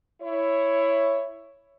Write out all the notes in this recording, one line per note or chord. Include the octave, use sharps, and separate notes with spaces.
E4 C#5